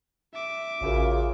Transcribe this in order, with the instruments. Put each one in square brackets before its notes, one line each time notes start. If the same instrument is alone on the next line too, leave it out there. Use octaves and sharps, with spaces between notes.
[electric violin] E5 D6
[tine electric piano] A1 F#4 A#4 [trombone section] C#3 [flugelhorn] F4